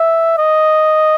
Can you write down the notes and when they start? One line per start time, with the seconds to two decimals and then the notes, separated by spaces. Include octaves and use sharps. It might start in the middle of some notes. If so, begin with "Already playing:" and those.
Already playing: E5
0.38 D#5